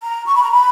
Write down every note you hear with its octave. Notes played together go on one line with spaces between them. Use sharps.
A#5
C#6
B5
A#5
B5